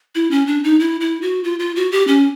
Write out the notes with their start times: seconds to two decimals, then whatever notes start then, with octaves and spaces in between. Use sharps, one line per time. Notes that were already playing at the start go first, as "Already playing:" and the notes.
0.15 E4
0.31 C#4
0.47 D4
0.64 D#4
0.80 E4
1.01 E4
1.22 F#4
1.44 F4
1.59 F4
1.76 F#4
1.92 G4
2.07 C#4